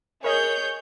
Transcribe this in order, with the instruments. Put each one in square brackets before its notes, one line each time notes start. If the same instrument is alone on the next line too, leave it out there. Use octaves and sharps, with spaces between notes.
[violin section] G#4 C#5 G6 [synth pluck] A#4 D#5